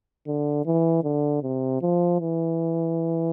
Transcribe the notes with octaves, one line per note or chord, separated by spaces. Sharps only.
D3
E3
D3
C3
F3
E3